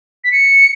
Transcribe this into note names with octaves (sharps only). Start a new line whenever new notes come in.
B6
C#7